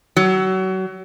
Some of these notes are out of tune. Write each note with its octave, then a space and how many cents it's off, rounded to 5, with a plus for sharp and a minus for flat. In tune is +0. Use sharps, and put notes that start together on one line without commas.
F#3 +30